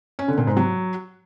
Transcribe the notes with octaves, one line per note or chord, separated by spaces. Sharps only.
C#4
D3
A#2
G#2
F#3